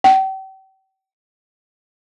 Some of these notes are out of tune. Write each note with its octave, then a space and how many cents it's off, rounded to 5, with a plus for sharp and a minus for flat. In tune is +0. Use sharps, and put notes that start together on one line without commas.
G5 -40